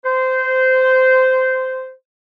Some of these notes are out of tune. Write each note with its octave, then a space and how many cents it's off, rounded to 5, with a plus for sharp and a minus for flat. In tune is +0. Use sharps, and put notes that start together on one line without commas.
C5 -15